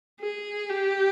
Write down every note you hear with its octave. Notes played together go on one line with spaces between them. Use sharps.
G#4
G4